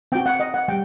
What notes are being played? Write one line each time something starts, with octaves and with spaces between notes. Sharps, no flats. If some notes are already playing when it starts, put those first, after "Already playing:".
C4 F#4 G5
F#5
D#5
F#5
G3 G5